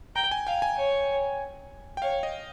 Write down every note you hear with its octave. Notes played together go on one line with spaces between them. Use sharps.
G5 A#5
G#5
F5 G5
G#5
C#5
G5
C#5 F5
D#5